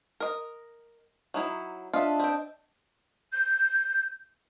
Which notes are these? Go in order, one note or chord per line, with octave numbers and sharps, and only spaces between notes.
A#4 D#5
F#3 D#4 E4
D4 F4 D#5 E5
C4 G5
G6